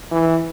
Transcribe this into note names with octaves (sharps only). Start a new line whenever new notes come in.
E3